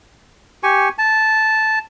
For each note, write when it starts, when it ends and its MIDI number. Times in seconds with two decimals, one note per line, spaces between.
0.63 0.89 67
0.63 0.89 80
0.63 0.89 85
0.98 1.79 81